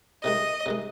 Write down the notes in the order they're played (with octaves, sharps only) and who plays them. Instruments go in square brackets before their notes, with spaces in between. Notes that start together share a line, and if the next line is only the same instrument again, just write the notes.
[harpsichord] C3 D#3 G#3 [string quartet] D#5
[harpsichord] C3 D#3 G#3